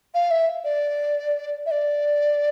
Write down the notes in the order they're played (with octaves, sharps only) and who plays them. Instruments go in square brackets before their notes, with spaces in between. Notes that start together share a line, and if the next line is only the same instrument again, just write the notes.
[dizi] F5
E5
D5
E5
D5